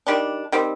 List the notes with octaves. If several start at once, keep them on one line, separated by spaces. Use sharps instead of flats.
D#3 G3 D4
D#3 G3 C4